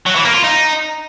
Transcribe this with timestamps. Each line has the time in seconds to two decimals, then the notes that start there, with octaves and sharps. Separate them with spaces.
0.06 F#3
0.15 E3
0.25 A#3
0.34 F4
0.43 D#4